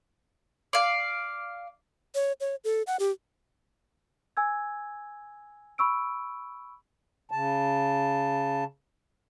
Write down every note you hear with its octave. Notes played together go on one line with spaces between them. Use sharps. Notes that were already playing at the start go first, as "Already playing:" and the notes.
D5 F5
C#5
C#5
A4
F#5
G4
G#5 E6 G#6
B5 C#6 E6 D7
C#3 A5